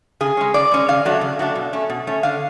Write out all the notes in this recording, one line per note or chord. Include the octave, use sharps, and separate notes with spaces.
C#3 G#4
G#3 C#4
C#3 D5
G#3 C#4
C#3 F5
F#3 A3 D4
C#3
F#3 A3 D4
B2
A3 C#4
B2
A3 C#4
D3 F5